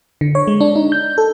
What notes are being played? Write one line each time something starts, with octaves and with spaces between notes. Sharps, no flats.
D3
C#5
G#3
D4
D#4
G6
A4